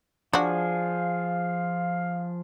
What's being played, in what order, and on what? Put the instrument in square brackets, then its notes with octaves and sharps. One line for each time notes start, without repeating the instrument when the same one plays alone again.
[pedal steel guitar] F3 G#4 [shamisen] D4 F#4 [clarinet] F5